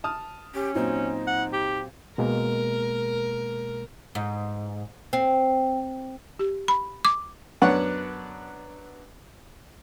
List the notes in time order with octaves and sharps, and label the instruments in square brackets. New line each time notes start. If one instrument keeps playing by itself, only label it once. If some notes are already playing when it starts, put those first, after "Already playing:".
[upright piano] A5 D#6 F6
[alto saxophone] C#4 [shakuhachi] G4
[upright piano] A#2 F#3 C4 [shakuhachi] D#4
[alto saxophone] F#5
G4
[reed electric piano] B2 G#3 A#3 [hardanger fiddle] A#4
[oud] G#2
C4
[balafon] G4
B5
D6
[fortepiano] F#2 B3 D4 C#5 F#5 C#6